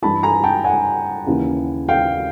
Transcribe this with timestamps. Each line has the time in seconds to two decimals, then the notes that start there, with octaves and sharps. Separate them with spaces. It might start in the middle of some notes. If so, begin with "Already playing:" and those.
0.02 G2 E3 A5 B5
0.23 G#5 A#5
0.44 G5 A5
0.64 F#5 G#5
1.26 D#2 C#3 E3
1.89 F5 G5